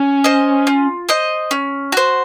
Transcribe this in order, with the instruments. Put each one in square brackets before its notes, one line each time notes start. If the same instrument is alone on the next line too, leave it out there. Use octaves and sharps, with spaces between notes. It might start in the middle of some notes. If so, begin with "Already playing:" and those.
Already playing: [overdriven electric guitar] C#4
[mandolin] C5 D#5
F4
C5 D#5
C#4
F#4 C5